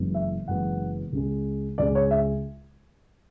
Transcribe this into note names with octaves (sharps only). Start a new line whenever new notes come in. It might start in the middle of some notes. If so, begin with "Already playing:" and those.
Already playing: F#1 F#2 E3 G#3 B3
E5
F#1 F#2 E3 G#3 B3 F#5
C#2 C#3 G#3
C#2 C#3 G#3 D5
C#5
E5